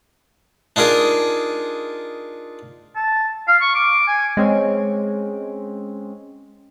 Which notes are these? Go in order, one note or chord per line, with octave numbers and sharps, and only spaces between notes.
D4 D#4 F4 G#4 A#4
A5
F5
C#6
D6
G#5
G#3 C4 C#4